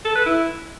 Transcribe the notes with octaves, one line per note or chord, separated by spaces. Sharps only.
A4
B4
E4